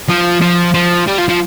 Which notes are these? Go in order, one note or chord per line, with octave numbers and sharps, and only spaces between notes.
F3
F3
F3
G3
F3
F3